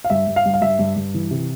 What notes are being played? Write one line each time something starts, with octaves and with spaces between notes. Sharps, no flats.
F5
G2 E5
G2
F5
G2
F5
G2 E5
G2
G2
E3
C3